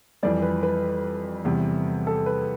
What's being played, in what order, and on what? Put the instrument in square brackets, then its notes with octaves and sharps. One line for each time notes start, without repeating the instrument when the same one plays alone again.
[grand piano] F2 E3 G3 D5
B4
B4
E2 C3 G3
A4
B4